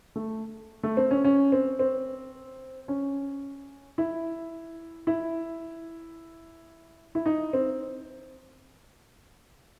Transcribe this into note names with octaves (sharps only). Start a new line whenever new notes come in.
A3
A3
C4
C#4
C#4
C4
C4
C#4
E4
E4
E4
D#4
C4